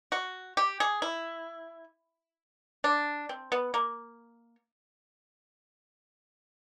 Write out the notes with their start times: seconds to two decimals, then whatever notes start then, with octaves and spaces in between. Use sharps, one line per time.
0.12 F#4
0.57 G4
0.80 G#4
1.02 E4
2.84 D4
3.29 C4
3.52 B3
3.74 A#3